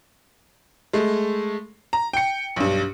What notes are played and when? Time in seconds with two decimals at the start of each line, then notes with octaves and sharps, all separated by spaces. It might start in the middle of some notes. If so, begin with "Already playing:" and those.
0.93 G#3 A3
1.93 A#5
2.13 G5 C#7
2.56 B1 G2